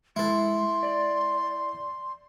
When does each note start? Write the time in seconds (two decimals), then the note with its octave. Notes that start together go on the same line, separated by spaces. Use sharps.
0.16 G#3 E4 A4 C6
0.83 D5